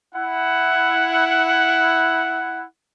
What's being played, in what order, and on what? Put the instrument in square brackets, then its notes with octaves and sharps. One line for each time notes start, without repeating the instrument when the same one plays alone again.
[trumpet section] E4 F#5